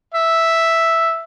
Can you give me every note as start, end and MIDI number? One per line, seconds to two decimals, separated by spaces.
0.14 1.23 76